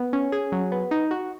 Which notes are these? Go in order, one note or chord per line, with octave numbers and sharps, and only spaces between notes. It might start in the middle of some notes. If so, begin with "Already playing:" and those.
Already playing: B3
C#4
G#4
F#3
B3
D#4
F#4